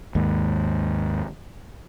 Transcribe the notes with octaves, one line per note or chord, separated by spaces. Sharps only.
D#2 G#2